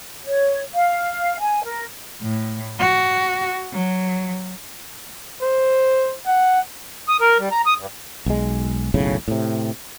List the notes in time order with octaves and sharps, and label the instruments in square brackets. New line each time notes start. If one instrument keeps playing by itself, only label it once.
[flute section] C#5
F5
G#5
A#4
[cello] A2
F#4
F#3
[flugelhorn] C5
F#5
[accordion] D#6
A#4
G3
A#5
D#6
G2
[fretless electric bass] B1 G#3
F#1 B1 A2 C#3
A2 C3